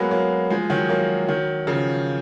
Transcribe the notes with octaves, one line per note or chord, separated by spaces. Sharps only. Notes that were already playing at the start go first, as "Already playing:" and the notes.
Already playing: F#3 G#3 A#3 B3
F#3 A#3
F3 G#3
D#3 F#3
F#3 A#3
D#3 F#3
C#3 F3